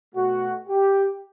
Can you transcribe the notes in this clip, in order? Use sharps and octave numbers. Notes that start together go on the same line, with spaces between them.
B2 A3 F#4
G4